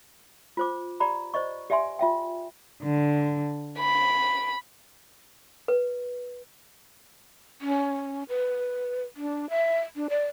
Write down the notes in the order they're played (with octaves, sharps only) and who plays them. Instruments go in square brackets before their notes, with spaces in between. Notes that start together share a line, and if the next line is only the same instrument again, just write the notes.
[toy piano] F4 C5 D6
G4 D5 A#5 B5
C5 D5 D#5 C#6
G4 D5 E5 G#5 C6
F4 E5 G5
[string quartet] D3
B5
[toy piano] B4
[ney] C#4
B4
D4
E5
D4
D5